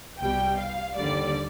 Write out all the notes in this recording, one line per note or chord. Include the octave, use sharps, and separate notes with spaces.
C2 B2 G3 G5
F5
D#2 D3 G3 D5